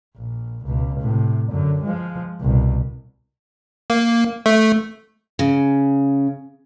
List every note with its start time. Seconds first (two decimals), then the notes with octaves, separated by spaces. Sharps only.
0.17 A#1
0.65 C#2 B2
1.00 A2 C3
1.51 F#2 D3
1.83 F3 G#3
2.41 C2 B2
3.90 A#3
4.46 A3
5.39 C#3